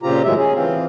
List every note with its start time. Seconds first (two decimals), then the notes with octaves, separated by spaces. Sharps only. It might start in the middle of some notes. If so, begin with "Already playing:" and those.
0.03 A#2 C#3 C4 F4 G4 A#5
0.24 A2 D#3 F#3 G#3 E5
0.37 C#4 G#4
0.55 E3 C4 F4